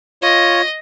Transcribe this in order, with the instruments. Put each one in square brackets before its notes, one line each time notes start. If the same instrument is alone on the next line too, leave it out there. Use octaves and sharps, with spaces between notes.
[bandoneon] F4 C#5 [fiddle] D#5